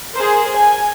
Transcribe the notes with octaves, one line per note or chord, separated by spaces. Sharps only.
G#4 A#4 C5
G#5